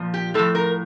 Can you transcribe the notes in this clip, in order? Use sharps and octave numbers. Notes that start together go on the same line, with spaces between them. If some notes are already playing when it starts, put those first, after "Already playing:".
Already playing: A#2 F3
G4
A2 F3 A4
A#4